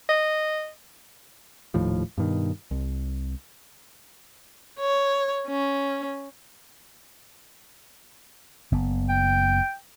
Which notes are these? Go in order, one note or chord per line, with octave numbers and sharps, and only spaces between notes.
D#5
D#1 D#2 A2 F3
G2 B2 D#3
C2
C#5
C#4
F#1 B3
G5